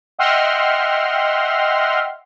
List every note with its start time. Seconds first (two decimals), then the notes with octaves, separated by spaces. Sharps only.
0.19 D#5 E5 F#5 G5 C6 F6